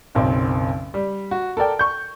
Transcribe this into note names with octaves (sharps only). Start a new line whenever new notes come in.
F#1 B1 C4
G3
F#4
A4 A#4 D5 G5
C#6 G6